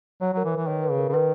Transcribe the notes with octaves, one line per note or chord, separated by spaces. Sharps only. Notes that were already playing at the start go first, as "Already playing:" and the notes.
F#3 C#5
F#3 A#4
E3
B4
E3
D#3 C#5
B4
C#3
A#4
C#3
D#3 B4